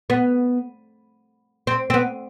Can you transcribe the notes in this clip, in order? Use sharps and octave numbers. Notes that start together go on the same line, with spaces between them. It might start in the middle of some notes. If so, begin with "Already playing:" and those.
B3
C4
C4
B3